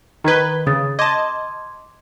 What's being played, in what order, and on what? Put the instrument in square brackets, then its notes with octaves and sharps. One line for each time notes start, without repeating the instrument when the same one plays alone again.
[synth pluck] D#3 B4 [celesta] A#5 G#6 G7
[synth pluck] C#3 [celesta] D#6 A6
[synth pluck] D#5 A5 [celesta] C6 D6 G#6